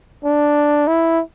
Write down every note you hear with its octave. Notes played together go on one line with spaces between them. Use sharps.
D4
E4